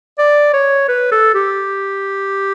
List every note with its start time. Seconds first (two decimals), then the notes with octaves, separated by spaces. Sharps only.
0.19 D5
0.54 C#5
0.88 B4
1.12 A4
1.35 G4